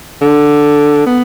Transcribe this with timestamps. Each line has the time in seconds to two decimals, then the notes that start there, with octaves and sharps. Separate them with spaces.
0.21 D3
1.06 B3